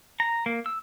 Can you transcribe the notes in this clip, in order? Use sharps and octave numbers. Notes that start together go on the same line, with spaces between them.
A#5
A#3
E6